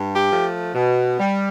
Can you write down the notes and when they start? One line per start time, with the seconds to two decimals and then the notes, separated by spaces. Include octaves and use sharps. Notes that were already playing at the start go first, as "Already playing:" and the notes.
Already playing: G2
0.15 G4
0.30 F3 A3
0.75 B2
1.19 G3